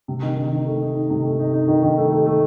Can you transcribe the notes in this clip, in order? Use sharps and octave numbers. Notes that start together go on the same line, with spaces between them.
C3
D#3
D#3
D#3
A3
D#4
D#4
C3
A3
D#4
D#4
D#3
D#3
A3
A3
A3